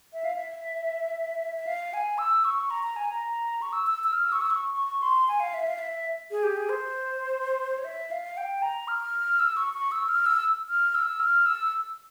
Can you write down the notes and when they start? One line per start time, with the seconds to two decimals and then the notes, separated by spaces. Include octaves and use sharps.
0.13 E5
0.24 F5
0.36 E5
1.57 E5
1.67 F5
1.94 G#5
2.18 E6
2.45 C#6
2.70 A#5
2.83 A#5
2.96 G#5
3.09 A#5
3.62 C#6
3.73 E6
3.87 E6
4.04 E6
4.12 F6
4.24 E6
4.32 C#6
4.41 E6
4.50 C#6
4.77 C#6
5.02 C6
5.28 G#5
5.40 F5
5.54 E5
5.67 F5
5.79 E5
6.31 G#4
6.43 G4
6.57 G#4
6.69 C5
7.78 C#5
7.85 E5
8.11 F5
8.37 G5
8.62 A#5
8.88 F6
9.39 E6
9.57 C#6
9.73 C#6
9.92 E6
10.09 F6
10.26 E6
10.69 F6
10.95 E6
11.20 F6
11.46 E6